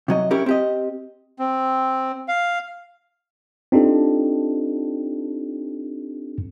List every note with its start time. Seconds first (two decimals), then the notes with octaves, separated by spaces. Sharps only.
0.08 C3 F#3 D#5
0.31 C#4 E4 G4 A#4
0.46 C4 G4 D#5
1.39 C4
2.28 F5
3.72 C4 D4 D#4 F4 G4 A4